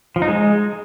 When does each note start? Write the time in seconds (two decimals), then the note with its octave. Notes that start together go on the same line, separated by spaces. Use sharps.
0.16 F3
0.22 D#4
0.28 G#3